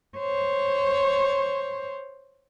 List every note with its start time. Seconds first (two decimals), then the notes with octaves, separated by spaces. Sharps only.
0.18 C5 C#5